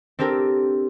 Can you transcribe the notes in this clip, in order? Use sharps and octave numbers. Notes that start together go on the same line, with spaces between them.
C4 D4 G4 A4 A#4